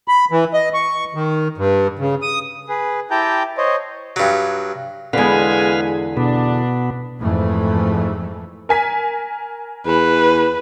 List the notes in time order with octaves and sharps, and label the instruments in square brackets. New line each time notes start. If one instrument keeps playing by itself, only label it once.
[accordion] B5
E3
D#5
C#6
D#3
G2
C#3
D#6
[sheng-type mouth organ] G#4 B4
E4 G4 G5 A5 A#5 G6
C5 C#5 D#5
[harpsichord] G2 F#3
[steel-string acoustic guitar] E2 D3 [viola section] G#3 G#5 [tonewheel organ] B4 F5
[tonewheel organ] B2 B3 [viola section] D4
[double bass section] F2 G#2 E3 A3
[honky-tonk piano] A#4 G#5 B6
[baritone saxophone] E2 [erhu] B4